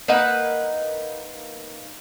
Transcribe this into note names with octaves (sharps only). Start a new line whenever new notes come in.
A#3 D#4 B4 F#5